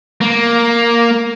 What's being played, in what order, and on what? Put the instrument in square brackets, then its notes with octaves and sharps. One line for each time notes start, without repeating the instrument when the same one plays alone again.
[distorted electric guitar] A#3